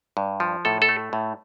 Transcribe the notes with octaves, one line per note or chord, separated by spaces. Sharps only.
G2
F3
A2 A4
A4
A3
A2